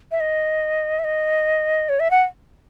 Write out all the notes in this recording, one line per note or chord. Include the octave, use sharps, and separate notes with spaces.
E5
D#5
E5
D#5
C#5
E5
F#5